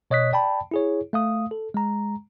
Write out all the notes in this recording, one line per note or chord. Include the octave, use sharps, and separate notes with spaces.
B2 C#5 D#5 D#6 F#6 B6
D5 G5 A5 B5
E4 G#4 C#5
A3 F5 D#6
A4
G#3 A#5